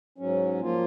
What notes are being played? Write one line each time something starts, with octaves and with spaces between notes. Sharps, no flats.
G#2 F#3 C#4
F3 A#3 F4